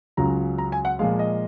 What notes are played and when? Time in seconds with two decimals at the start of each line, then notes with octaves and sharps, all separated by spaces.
0.17 C#2 C#3 F#3 A#5
0.58 A#5
0.72 G#5
0.85 F#5
0.99 A#2 F3 G#3 F5
1.19 D#5